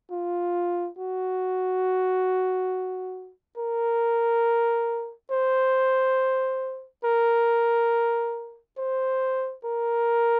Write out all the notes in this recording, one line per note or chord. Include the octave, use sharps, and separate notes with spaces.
F4
F#4
A#4
C5
A#4
C5
A#4